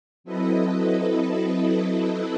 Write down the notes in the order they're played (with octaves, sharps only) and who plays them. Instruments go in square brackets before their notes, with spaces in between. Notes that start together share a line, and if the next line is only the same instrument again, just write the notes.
[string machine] F#3 C4 E4 A4 B4 D#5